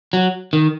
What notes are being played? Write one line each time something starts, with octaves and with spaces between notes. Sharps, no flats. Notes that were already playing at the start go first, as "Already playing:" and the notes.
F#3
D#3